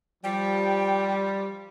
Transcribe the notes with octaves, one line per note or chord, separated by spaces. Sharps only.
F3 G3 G5